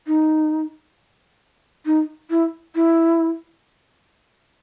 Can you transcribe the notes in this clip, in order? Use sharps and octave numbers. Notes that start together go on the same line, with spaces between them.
D#4
D#4
E4
E4